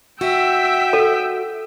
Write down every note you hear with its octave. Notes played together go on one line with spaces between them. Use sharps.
F#4 E5 G5 E6 B6
A4